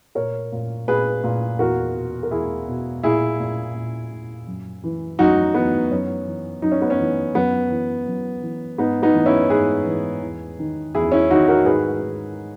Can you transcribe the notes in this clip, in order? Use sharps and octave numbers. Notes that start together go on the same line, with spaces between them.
A#2 A#4 C#5
A#2
A#2 G#4 B4
A#2
E2 F#4 A#4
B2
A#4
E2 E4 G#4
B2
A#2 E4 G#4
A#2
A#2
A#2
F#2
E3
F#2 D#4 F#4
E3 B3
F#2 C#4
E3
F#2 D#4
C#4
B3
C#4
E3
F#2 B3
E3
F#2
E3
G#2 B3 D#4
B3 D#4
E3
C#4 E4
G#2 G#4 B4
E3
E2
D#3
E2 E4 G#4
C#4 E4
D#3 D#4 F#4
F#4 A#4
G#2 G#4 B4
D#3